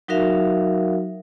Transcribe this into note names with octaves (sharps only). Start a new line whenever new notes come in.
F#3 D#4 F#4 A#4 E5 F5